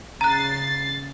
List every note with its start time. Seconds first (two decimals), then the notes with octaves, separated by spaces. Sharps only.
0.21 C#3 A#5 F#6 A6 C7